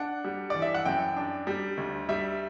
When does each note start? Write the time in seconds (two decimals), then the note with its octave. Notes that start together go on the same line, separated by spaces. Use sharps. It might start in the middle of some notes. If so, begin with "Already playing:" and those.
Already playing: D4 F#5
0.24 G3
0.50 E3 D5
0.62 E5
0.74 F#5
0.85 F#2 G5
1.17 D4
1.47 G3
1.77 D2
2.09 G3 E5